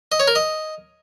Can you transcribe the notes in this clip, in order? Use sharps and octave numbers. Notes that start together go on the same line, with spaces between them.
D#5
C#5
A#4
D#5